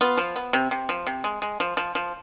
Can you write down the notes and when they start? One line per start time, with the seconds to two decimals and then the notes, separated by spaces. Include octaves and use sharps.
0.01 B3 F4
0.17 F3
0.36 B3
0.53 C3
0.71 C3
0.89 F3
1.07 C3
1.24 G#3
1.42 G#3
1.60 F3
1.77 F3
1.95 F3